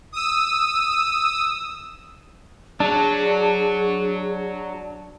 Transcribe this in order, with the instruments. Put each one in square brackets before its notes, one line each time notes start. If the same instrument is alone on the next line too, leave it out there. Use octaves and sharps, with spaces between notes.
[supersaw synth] D#6 E6
[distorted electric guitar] F#3 [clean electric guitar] D4 [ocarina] G#4